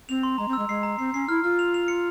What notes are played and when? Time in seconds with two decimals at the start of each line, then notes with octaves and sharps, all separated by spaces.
0.09 C4 F7
0.23 C6
0.38 G#3 A#5
0.48 C4
0.53 E6
0.59 G#3
0.69 G#3 C7
0.83 A#5
0.99 C4 C7
1.14 C#4 C7
1.29 E4 F6
1.44 F4 F6
1.59 F7
1.74 F7
1.88 C#7